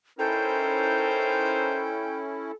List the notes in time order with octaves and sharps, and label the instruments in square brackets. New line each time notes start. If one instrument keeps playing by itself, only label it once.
[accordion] C#4 E4 [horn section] D#4 A#4 C5 [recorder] A4 [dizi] G5